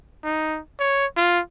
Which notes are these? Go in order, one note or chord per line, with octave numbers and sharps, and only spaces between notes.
D#4
C#5
F4